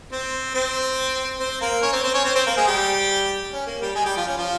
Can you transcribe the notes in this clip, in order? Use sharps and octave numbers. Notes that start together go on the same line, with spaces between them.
C4 C5
C4 C5
C4 C5
A#3 A#4
C#4 C#5
C4 C5
C4 C5
C#4 C#5
C4 C5
C4 C5
A#3 A#4
G#3 G#4
G3 G4
C#4
A#3
G3 G4
G#3 G#4
G3 G4
F3 F4
C#4
F3 F4